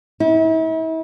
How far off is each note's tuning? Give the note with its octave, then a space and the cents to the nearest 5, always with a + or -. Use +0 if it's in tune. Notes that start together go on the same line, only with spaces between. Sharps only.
E4 -40